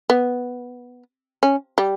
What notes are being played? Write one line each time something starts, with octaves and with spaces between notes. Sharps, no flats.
B3
C#4
G3